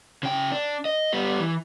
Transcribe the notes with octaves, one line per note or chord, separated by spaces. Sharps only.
C#3 G5
D4
D#5
G3 B3
E3